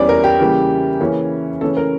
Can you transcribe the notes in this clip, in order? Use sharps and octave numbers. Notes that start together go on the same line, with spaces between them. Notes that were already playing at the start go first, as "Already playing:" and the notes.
Already playing: E2 E3 G3 C#4 D5
A#4
G4
C#3 E3 G3 A#3
C#3 E3 A#3 C#4
C#3 E3 A3 C#4 A4
A#4